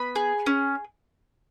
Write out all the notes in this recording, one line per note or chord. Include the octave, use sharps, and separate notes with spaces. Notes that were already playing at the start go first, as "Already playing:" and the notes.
Already playing: B3 B5
G#4
C#4